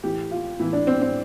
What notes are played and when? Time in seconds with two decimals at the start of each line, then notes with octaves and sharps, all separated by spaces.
0.03 A2 E3 G4
0.31 F4
0.59 A2 E3 E4
0.73 D4
0.87 C4
1.02 C4